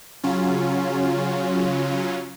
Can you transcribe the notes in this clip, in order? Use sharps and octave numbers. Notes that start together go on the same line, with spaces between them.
C#3 F#3 C#4 F4